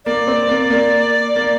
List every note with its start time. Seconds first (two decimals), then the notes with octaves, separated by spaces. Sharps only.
0.05 A#3 D5
0.27 C4
0.49 A#3
0.70 A#3
1.36 A#3